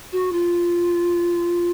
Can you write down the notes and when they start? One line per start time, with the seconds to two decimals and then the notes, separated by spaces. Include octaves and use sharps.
0.12 F#4
0.32 F4